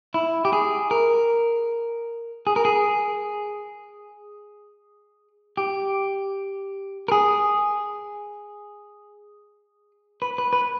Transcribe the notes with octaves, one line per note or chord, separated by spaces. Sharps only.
E4
G4
G#4
A#4
G#4
A#4
G#4
G4
A#4
G#4
B4
B4
B4